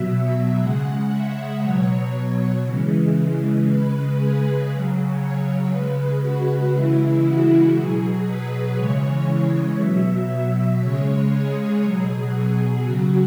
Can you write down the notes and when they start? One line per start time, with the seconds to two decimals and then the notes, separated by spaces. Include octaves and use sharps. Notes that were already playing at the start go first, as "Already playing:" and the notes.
Already playing: B2 F#3 E5
0.60 C#3 G#3 F#5
1.11 E5
1.62 B2 F#3 C#5
2.65 C#3 E3 G#3
3.66 C#3 G#3 B4
4.18 G#4
4.69 C#3 F#3
5.20 C#5
5.71 C#3 G#3 B4
6.22 F#4
6.73 C#3 E3 G#3 E4
7.24 F#4
7.75 B2 F#3 G#4
8.26 B4
8.77 C#3 E3 G#3 C#5
9.79 B2 F#3 E5
10.30 E5
10.81 C#3 G#3 C#5
11.32 G#4
11.83 B2 F#3 G#4
12.35 G#4
12.86 C#3 F#3 F#4